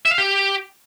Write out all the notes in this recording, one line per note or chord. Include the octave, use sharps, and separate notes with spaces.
E5
F5
G4